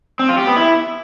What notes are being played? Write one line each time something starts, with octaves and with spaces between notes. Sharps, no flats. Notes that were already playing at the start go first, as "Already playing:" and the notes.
C4
F4
G4
B3
E4